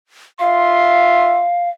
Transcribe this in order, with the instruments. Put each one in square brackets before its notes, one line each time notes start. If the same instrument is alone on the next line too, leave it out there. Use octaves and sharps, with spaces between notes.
[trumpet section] F4 E5 C6 [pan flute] F5